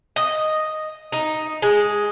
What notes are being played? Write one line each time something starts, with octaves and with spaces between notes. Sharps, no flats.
D#5
D#4
G#3